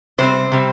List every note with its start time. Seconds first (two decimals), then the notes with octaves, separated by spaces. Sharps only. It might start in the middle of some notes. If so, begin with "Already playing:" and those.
0.18 C3 G3 C4 C5
0.52 C3 G3 C4